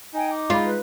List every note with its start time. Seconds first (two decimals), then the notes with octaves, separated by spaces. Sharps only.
0.14 D#4 G5 G#5
0.31 D6
0.50 G#3 F4 B5
0.64 B4